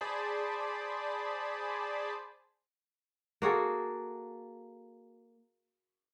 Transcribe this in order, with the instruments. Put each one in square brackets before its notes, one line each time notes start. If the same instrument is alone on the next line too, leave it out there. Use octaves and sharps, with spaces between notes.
[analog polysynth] G#4 C5 D5 A5 B5
[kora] A#3 F#4 G#4 A4